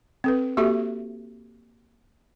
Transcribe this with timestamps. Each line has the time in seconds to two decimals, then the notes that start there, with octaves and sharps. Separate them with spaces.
0.24 C4 A4 B4
0.57 A#3 F#4 G4 A4 E5